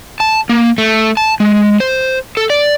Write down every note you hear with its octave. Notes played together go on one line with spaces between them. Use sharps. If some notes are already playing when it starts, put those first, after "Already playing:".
A5
A#3
A3
A5
G#3
C5
A4
D5